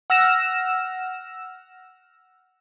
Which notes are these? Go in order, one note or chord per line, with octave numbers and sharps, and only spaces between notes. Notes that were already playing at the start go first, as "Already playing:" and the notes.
F#5 E6 F6 A#6 E7